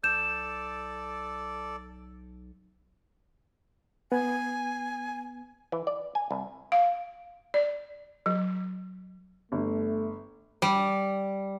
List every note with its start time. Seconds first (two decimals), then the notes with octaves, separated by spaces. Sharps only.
0.04 B1 A4 D5 G6 E7
4.12 B3 G#5
5.72 E3
5.87 D5
6.15 G#5
6.31 C2
6.72 F5
7.54 D5
8.26 F#3
9.52 G1 A3
10.62 G3